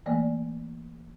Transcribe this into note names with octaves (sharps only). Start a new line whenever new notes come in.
E3 A3 A#3 D5